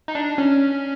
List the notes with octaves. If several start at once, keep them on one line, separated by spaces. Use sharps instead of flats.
D#4
D4
C#4